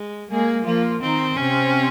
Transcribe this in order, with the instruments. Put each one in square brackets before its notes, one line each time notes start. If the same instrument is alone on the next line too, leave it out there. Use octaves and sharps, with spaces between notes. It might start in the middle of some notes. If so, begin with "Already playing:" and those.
Already playing: [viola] G#3
[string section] G#3 G#4 [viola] A#3
[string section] F3 F4 [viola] A#3
[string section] D#3 D#4 [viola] C4
[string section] C3 C4 [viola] C#4